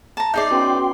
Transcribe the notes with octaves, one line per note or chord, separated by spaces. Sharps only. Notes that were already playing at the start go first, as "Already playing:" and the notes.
A5 A#5
D#4 G#4 D5 E5 G6 C7
B3 C#4 F#4 G5 C6